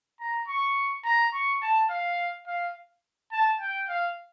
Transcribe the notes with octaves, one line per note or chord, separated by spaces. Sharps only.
A#5
C#6
A#5
C#6
A5
F5
F5
A5
G5
F5